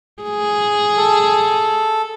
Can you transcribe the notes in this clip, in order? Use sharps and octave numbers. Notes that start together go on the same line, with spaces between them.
G#4
A4